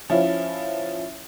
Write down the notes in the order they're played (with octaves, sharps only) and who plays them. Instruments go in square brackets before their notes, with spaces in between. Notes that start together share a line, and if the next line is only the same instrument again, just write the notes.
[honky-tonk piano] F3 C#4 E4